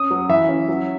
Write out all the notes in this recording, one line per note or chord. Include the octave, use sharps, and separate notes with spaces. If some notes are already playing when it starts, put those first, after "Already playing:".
Already playing: C#4 D#6
F#3
E3 E5
C#4
F#3